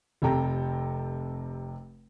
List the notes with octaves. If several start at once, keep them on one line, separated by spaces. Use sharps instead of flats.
F1 C3 A4 G5 A#5